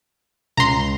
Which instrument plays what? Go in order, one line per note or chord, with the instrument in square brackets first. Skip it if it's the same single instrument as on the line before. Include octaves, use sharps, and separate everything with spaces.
[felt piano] C#2 [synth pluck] A#5 C6